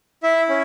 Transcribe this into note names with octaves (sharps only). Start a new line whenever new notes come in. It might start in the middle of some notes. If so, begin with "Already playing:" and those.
E4 E5
C#4